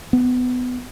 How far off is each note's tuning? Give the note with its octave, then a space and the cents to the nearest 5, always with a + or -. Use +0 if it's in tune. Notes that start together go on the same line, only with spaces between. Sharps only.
B3 +20